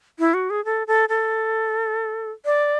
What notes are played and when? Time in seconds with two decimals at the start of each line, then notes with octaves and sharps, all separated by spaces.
0.19 E4
0.34 F#4
0.50 G#4
0.65 A4
0.87 A4
1.09 A4
2.45 D5